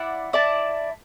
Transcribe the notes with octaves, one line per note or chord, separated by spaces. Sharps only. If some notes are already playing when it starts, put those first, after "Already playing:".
Already playing: E4 D5 F#5
E4 D5 A5